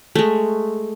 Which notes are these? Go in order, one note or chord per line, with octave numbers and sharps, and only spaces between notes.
G#3 A3